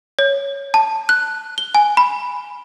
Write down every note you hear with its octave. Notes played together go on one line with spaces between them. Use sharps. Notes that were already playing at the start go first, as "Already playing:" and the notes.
C#5
A5
F#6
G7
G#5
B5